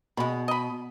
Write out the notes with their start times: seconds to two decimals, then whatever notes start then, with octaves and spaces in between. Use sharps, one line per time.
0.17 B2 G#3 B5
0.48 D#5 B5